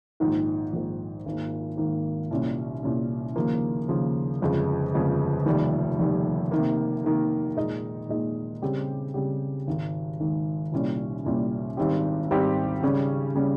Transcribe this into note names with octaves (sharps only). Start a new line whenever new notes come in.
A#1 G#2 D#3
A#1 G#2 D#3
G#1 G#2 D#3 A#3
G#1 G#2 D#3 A#3
C2 A#2 G3 C#4
C2 A#2 G3 C#4
D#2 C#3 F3 A#3
D#2 C#3 F3 A#3
G1 F2 C#3 G#3
G1 F2 C#3 G#3
F1 D#2 D#3 G3
F1 D#2 D#3 G3
C3 D#3 A#3
C3 D#3 A#3
A#2 G#3 D#4
A#2 G#3 D#4
C#3 G3 C4 G4
C#3 G3 C4 G4
G#1 G#2 D#3
G#1 G#2 D#3
C2 A#2 G3 C#4
C2 A#2 G3 C#4
G#1 G#2 G3 C4 G4
G#1 G#2 G3 C4 G4
C#3 G3 C#4
C#3 G3 C#4